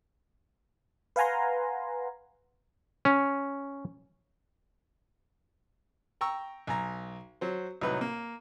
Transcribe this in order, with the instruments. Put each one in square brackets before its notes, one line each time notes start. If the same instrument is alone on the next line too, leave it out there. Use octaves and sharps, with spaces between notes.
[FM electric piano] B4 F5 F#5 G#5 A#5 C6
[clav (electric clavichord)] C#4
[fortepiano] G5 A#5 C#6 E6
B1 G#5 A#5
F#3 C5
C2 A2 F#3 D#4 B4
A#3